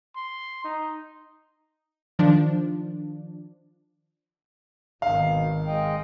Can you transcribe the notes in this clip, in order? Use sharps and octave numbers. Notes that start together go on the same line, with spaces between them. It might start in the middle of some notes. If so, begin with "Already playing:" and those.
C6
D#4
D#3 F3 D4
G#1 B2 D#3 F5
G#3 D#5 G5